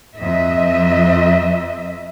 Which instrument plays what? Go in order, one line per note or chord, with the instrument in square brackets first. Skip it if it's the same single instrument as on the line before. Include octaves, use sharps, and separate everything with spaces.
[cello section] F2 D#5 E5